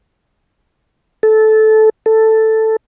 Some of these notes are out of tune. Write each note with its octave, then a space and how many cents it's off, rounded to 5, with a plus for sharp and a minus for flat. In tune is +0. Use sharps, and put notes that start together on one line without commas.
A4 -15
A4 +5